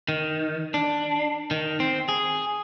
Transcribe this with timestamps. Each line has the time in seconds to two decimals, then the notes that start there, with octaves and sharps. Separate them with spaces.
0.09 D#3
0.74 D4
1.51 D#3
1.80 C4
2.09 G#4